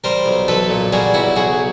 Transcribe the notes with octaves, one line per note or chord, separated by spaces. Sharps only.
G3 A#4 C5
B1
B1 A4 B4
A#2
G3 F#4 G#4
B1 E4 F#4
B1 F#4 G#4